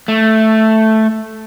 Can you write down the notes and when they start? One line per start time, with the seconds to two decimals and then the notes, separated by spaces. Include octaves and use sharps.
0.08 A3